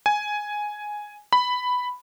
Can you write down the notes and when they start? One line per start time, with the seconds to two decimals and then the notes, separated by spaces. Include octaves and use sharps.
0.06 G#5
1.33 B5